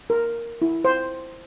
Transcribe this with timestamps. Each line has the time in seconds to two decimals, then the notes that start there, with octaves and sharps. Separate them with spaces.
0.10 A#4
0.62 E4
0.85 C5